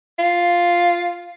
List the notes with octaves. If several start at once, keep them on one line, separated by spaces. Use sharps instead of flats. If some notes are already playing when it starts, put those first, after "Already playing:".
F4